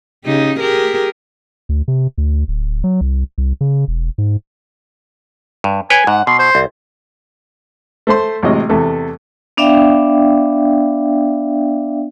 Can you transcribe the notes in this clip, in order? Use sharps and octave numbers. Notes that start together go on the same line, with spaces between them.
C#3 D#4 G4
G4 G#4 A#4
D2
C3
D2
D1
F#3
C2
C2
C#3
E1
G#2
G2
B4 C#5 G5 G#5
G#2 F#5
B2 C6
C5
C2
A3 C5 C6
A1 C3 F#3 G#3 D#5
E2 C3 A3
B3 D4 D5 E5 F5 G5